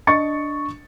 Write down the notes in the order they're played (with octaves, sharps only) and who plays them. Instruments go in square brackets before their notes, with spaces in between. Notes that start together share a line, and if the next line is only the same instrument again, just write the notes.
[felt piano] D4 D#5 C#6 A6 C#7